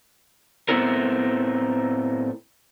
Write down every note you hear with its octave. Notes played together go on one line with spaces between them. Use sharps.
A2 A3 B3 C4 E4 A#4